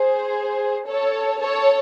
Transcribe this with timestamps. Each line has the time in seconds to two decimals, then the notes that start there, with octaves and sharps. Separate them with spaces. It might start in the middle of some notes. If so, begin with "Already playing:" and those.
Already playing: G#4 C5
0.87 A4 C#5
1.41 A4 C#5